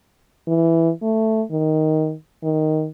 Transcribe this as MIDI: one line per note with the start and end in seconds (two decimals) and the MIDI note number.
0.47 0.90 52
1.02 1.42 57
1.51 2.14 51
2.43 2.88 51